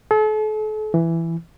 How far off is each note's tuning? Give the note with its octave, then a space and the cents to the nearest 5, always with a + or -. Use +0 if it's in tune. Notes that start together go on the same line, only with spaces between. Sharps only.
A4 -40
E3 +10